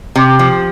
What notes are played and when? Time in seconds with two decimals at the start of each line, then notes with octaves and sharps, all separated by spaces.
0.15 C3
0.39 F3